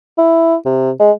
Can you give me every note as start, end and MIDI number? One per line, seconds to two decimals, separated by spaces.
0.18 0.55 64
0.65 0.91 48
0.99 1.12 56